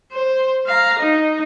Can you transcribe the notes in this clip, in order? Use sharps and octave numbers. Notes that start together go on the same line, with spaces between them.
C5
F5 A#5
D#4